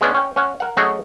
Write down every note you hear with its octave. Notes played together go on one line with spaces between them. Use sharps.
G#3 B3 C#4 D4
C#4 G5
C#4 F#5
A#4 F#5
F#3 A3 C#4 F#4 G#4 D#5